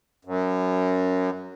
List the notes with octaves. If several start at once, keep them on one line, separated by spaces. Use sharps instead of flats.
F#2